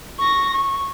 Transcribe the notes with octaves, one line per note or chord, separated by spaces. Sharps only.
C#6 A#6
C#6